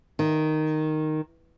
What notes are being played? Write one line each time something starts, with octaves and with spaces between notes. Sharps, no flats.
D#3